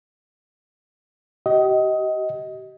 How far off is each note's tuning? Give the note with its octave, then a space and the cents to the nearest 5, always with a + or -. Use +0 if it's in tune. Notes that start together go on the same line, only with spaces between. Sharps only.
G4 -40 D#5 +20